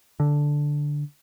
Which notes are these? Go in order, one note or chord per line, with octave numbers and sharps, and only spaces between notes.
D3